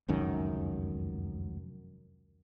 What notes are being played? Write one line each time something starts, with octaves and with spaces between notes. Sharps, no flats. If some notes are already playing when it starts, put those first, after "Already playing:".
F1 C#2 F#2 D#3